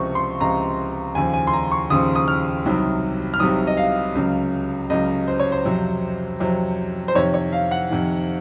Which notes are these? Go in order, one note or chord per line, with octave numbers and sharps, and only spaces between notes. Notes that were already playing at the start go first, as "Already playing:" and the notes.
Already playing: C#2 C3 F3 C#6
C6
C#2 C3 F3 A#5
D#2 C#3 F3 G#5
G#5
C6
A#5
C#6
D#2 C#3 F3 D#6
D#6
F6
C2 C3 D#3 F#3
F6
C2 C3 D#3 F#3 D#6
D#5
F5
C#2 C#3 F#3
C#2 C#3 F#3 D#5
C5
C#5
C5
F2 C3 F#3
F2 C3 F#3
C5
F2 C3 D#3 C#5
C#5
F5
F#5
F2 C3 D#3